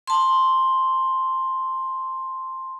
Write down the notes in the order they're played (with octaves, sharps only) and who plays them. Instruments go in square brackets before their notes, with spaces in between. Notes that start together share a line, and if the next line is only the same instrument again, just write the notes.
[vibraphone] A5 C6